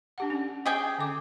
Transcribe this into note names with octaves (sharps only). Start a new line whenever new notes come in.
D4 G4 F#5
C#4
G4 G#4 G5
D3 C#4 D6